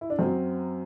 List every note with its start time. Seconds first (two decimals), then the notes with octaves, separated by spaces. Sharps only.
0.01 E4
0.10 D4
0.19 F#2 F#3 C4